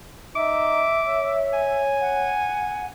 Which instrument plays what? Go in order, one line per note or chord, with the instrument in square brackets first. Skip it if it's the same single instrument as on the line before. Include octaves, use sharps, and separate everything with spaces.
[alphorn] D#4 [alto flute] E5 [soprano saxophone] D6
[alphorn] C#5
[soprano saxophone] G#5
[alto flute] F#5